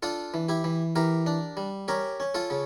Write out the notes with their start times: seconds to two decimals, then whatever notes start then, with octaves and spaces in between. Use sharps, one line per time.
0.03 D4 F4 A4
0.34 E3
0.49 E4 G4
0.64 E3
0.96 E3 G4 A#4
1.26 D4
1.57 G3
1.88 C#4 G4 A#4
2.20 C#4
2.34 F4 A4
2.50 C#3